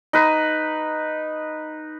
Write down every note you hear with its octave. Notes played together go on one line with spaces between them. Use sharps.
D#4 B4